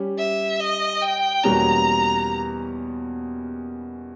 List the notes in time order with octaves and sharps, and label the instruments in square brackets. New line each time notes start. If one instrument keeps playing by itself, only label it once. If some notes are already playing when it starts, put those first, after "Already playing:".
Already playing: [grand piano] G3 C#4 G4
[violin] E5
D#5
G5
[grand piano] E2 B2 G3 A#3 C#4 [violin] A#5